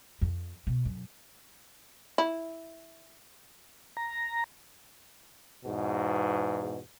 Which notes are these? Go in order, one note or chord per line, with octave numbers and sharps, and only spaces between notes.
F2
B2
F#2
E4
A#5
E2 G#2 B2